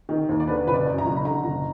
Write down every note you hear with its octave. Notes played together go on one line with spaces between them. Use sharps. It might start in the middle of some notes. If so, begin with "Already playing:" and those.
D#3
D#2
D5
D3 B4
F#1 B4
D5
F#2
A#5
F#1
B5
D3 A#5
F#1